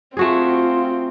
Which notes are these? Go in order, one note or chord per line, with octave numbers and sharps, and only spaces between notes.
A3 C4 F4 F#4 G#4